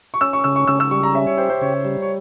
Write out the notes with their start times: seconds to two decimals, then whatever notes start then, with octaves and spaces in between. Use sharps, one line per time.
0.14 C#6
0.21 C#4 E6
0.33 C#6
0.44 C#3 E6
0.56 C#6
0.68 C#3 E6
0.80 E6
0.91 G3 C#6
1.03 A#5
1.15 C#4 E5
1.27 C#5
1.38 G4 C5
1.50 C5
1.62 C#3 C#5
1.85 G3
2.02 C#5